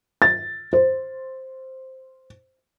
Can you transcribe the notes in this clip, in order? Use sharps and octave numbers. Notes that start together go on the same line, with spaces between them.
A6
C5